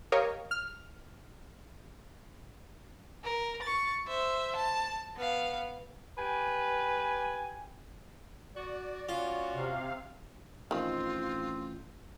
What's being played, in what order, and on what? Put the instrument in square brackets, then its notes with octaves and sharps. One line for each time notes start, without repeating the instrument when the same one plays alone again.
[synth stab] G4 A#4 C#5 D#5 F5
F6
[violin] A#4
C#6 A6
C5 E5
A5
B3 F5
[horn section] G4 G5 G#5 [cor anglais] B4
[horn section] F#4 [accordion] D5
[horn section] C#4 F#4 [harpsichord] F4
[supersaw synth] C3 F5
[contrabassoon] A1 [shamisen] D#3 F3 [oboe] C4 [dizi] F4